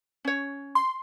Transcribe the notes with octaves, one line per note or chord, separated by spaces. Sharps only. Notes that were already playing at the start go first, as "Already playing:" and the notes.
C#4 C#5
C6